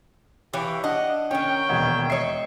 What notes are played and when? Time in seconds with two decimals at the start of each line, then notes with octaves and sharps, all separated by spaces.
0.54 E3 G4 C#5 F5
0.84 D4 D#5 F#5
1.31 D#3 C#4 C#5 G5
1.69 E1 D#2 B2
2.10 C#5 D#5 E5 C7